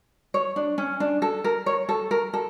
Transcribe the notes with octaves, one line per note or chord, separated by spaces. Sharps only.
C#5
D4
C#4
D4
A4
A#4
C#5
A4
A#4
A4